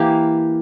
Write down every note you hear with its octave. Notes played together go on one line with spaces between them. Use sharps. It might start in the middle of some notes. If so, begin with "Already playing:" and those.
Already playing: E3 A#3 G4